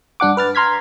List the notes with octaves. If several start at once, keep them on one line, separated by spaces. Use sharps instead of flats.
G2 D4 F#5 D6
B4 F6 A6
A#5 C6 F6 G#6 B6